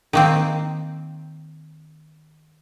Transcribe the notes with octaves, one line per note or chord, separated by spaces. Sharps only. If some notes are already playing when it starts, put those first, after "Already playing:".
D#3 A#3 C4